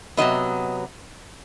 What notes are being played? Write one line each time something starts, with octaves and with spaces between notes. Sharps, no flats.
C3 F#3 B3 D#5